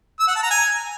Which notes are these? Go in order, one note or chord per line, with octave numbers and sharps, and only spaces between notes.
E6
F#5
A5
A#5
G#5